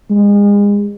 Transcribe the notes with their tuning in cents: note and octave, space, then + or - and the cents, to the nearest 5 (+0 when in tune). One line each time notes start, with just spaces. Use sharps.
G#3 -35